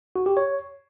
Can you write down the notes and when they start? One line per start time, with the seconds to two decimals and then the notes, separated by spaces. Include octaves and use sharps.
0.16 F#4
0.26 G4
0.37 C#5